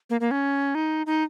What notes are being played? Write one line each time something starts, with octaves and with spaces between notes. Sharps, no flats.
A#3
A#3
C#4
D#4
D#4